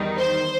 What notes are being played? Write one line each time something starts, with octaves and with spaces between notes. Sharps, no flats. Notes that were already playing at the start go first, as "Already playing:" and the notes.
Already playing: E2 D#3 G3 D#4
C5